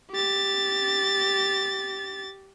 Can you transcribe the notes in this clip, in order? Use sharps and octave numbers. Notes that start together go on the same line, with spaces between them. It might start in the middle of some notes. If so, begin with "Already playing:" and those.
G4 A6